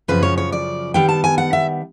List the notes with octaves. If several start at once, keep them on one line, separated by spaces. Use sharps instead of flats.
F#2 C#3 F3 B4
C#5
C#5
D5
D#3 G3 B3 G5
A5
G#5
F#5
E5